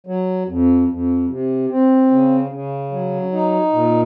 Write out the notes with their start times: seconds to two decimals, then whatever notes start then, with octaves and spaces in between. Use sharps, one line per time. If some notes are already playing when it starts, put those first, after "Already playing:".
0.06 F#3
0.48 F2
0.88 F2
1.29 C3
1.70 C4
2.11 C#3
2.52 C#3
2.91 F#3
3.32 D#4
3.73 A#2